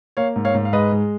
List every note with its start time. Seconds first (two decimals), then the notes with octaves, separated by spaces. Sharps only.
0.17 A#3 C#5 F5
0.36 G#2
0.45 C#5 F5
0.54 G#2
0.65 F5
0.73 G#3 B4 D#5
0.92 G#3